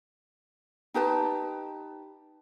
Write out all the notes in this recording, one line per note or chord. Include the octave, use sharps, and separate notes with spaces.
D#4 G4 B4 A5